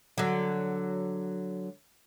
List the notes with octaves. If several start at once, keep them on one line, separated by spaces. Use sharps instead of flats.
D3 F#3